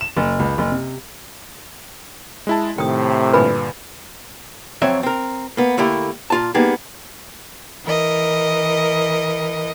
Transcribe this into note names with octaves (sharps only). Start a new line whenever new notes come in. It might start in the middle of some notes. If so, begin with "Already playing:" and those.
E7
F#1
C#2
F#1
C3
G#3 E4 A5
A2 C3 D#3 G5 D#6
G2 A#2 D3 B4 G#5 B5
F2 F#3 C4 C#5 E5
C4 A#4
A#3 B3
D3 A3 A#3 E4 G4
A#2 F4 A5
G3 A#3 B3 D#4 G#4
E3 A#4 D#5